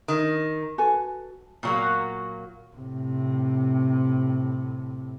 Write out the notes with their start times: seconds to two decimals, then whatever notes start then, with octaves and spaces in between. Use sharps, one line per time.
0.08 D#3
0.78 F#4 A4 B4 G#5
1.63 A#2 F#3 A#3
2.77 A2 C3